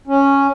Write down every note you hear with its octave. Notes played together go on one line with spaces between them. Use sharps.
C#4